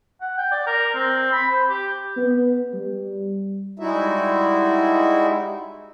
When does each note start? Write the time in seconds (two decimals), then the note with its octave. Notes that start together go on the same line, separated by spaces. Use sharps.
0.21 F#5
0.38 G5
0.51 D5
0.67 A#4
0.95 C4
1.32 B5
1.50 C5
1.69 G4
2.17 B3
2.73 G3
3.79 G3 G#3 D#4 E4 F#4 E5